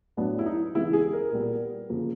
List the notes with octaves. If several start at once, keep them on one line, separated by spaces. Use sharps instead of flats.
A2 F#3 B3 D4
E4
D#4
C#3 E3 G#3 B3 E4
G#4
A#4
A#2 G3 B3
C#3 F3 A#3